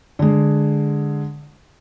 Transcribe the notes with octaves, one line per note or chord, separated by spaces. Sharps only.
D3 G#3